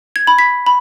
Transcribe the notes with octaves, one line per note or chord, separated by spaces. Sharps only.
G#6
B5
B6
B5